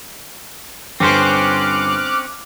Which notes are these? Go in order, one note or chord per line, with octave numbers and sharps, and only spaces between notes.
G1 C4 C#4 C5 C6 D6 F6 F#6